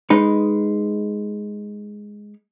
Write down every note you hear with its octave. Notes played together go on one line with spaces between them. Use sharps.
G#3 D#4 B4